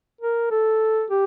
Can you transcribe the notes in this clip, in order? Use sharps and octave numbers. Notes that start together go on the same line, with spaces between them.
A#4
A4
G4